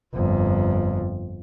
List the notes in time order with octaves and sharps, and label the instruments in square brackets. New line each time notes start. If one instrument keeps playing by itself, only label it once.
[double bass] G1 F2